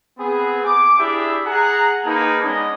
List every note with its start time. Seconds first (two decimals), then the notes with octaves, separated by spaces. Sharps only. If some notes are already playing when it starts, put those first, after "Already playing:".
0.18 B3 C4 G#4
0.64 D6
0.98 D4 E4 G4 G#4 D5 E5
1.46 G#4 F#5 A#5
2.04 A#3 D#4 G#4 A#4 B4 A5
2.43 G#3 B3 C#4 D5 D#5